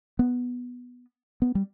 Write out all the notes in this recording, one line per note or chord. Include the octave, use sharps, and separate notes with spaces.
B3
B3
G3